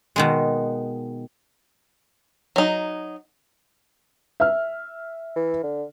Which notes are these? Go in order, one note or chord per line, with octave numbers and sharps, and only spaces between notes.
B2 D#3 G#3
F#3 D#4
E5 F6
E3
D3